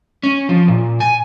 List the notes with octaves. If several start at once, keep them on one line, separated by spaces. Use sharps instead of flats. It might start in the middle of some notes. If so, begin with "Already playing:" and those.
C#4
F3
A#2
G#5